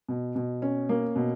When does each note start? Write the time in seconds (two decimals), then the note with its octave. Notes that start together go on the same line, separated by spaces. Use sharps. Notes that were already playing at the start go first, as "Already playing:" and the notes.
0.09 B2
0.36 B2
0.62 C#4
0.89 A#3
1.16 B2